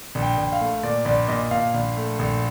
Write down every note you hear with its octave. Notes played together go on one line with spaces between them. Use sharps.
A#1
G5
A#1
F5
A3
A#2 D5
A#1 D5
A#2 D#5
A#2 F5
A#1
A3
A#1